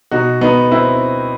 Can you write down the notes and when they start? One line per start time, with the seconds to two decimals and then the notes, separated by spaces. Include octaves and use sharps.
0.11 B2 D#4 F#4
0.41 B3 D#4
0.71 C4 E4